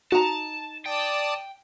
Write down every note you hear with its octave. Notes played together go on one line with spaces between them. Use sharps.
D#4 F#4 A5 A#5
D5 G5 A5 D#6